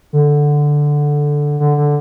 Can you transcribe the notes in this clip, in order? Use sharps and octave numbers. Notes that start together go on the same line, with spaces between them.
D3
D3
D3